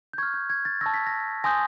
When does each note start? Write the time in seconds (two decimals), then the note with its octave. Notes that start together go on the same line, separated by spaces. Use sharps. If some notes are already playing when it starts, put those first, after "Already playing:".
0.13 G6
0.18 C#6 F6 G#6
0.34 G6
0.50 G#6
0.65 A6
0.81 A5 C#6 E6 A#6
0.94 B6
1.07 A#6
1.44 G#5 C6 D#6 G6 A#6